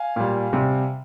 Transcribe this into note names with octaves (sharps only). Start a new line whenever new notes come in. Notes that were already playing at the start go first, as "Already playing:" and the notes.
Already playing: F5 G#5
A#2 G3
C3 G3